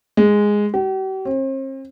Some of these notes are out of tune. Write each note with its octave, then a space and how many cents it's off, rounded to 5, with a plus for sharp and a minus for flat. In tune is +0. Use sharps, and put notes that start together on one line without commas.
G#3 -5
G4 -45
C4 +45